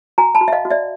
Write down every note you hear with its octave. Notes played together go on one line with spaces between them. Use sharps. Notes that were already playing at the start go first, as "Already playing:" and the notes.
F#4 G#5 A#5
A5 B5
F#4
E5
D#5 F5
F#4
D5 E5